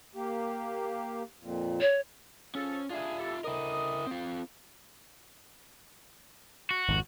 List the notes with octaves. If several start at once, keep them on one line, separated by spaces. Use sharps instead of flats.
A#3 G4
F2 A#2
C#5
F3 C#4 G#4 A4
D4 F4 G#4 E5
E4 G4 A4
D2 E4 A#4 D#5 D#6
C4 F4
F#4
G#1 F2